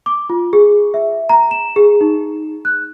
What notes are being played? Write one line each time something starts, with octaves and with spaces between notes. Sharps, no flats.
D6
F4
G#4
E5
A#5
E7
G#4
D#4
F#6